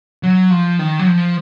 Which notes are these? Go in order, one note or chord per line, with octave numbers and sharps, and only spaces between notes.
F#3
F3
D#3
F#3
F3